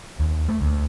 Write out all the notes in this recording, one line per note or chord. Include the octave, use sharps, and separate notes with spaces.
D#2
A3
D2